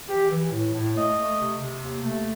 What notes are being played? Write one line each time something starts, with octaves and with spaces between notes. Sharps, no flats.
E3 G4
E3
A2
A2
A3 D#5
A3
C3
C3
D#2
A3